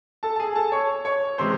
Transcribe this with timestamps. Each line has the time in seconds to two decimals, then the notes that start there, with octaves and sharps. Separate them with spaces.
0.23 A4 A5
0.36 A5
0.40 G#4 G#5
0.56 A4 A5
0.72 C#5 C#6
1.05 C#5 C#6
1.38 C3 E3 G#3 C5 C6